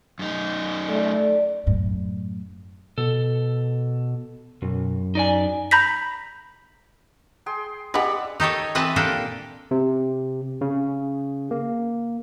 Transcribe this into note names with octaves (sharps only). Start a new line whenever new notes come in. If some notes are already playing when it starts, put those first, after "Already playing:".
F#2 D#4
A3 D5
F#2 A2
B2 A4
B1 F#2
D#4 D5 G#5
A#5 B5 G6 A#6 B6
G#4 G5 C6
G4 G#4 D5 D#5 F#5 B5 E6
D#4 G4 A4 C#5
E3 C4 B4 D#5 A5
A#2 A#3 D4 G4 A4
C3
C#3
A#3